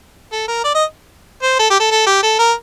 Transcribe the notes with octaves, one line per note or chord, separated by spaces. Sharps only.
A4
A#4
D5
D#5
C5
A4
G4
A4
A4
G4
A4
A#4